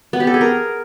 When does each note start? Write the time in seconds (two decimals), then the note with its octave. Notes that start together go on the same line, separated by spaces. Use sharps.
0.13 B3
0.20 G4
0.27 A4
0.34 G#4
0.41 A#4